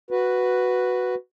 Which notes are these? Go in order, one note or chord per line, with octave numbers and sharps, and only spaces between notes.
F#4 B4